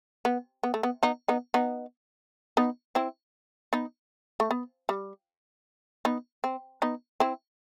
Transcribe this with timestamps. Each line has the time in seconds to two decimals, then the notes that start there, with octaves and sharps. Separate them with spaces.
0.25 B3
0.63 B3
0.74 A3
0.83 B3
1.03 B3 D#4
1.28 B3 D#4
1.54 B3 D#4
2.57 B3 D#4
2.95 C4 E4
3.73 B3 D#4
4.40 A3
4.51 B3
4.89 G3
6.05 B3 D#4
6.44 C4
6.82 B3 D#4
7.20 C4 E4